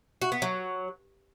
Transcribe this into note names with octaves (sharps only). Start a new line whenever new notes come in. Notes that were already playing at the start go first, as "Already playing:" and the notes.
F#4
B3
F#3